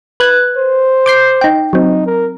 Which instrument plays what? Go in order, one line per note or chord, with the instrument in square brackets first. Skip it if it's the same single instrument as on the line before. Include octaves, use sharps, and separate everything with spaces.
[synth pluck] B4 F#6 G#6
[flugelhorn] C5
[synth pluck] D6 G6 C7
D#4 G5
[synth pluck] F#3 C4 [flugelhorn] D#4
[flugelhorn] A#4